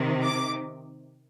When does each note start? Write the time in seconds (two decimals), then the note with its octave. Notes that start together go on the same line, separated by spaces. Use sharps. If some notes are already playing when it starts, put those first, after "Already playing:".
Already playing: C3 D#3
0.23 D6